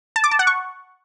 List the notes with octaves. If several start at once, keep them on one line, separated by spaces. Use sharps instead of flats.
A5
D6
A5
F#5
C#6